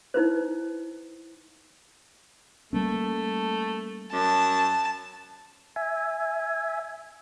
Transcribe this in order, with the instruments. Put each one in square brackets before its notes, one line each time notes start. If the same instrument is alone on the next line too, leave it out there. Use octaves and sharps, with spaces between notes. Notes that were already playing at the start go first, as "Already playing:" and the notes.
[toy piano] D#4 E4 B4 C5
[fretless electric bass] G3 A#3 C#4 [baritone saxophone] A3
[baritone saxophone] F#2 [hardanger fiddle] A5
[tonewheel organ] E5 G#5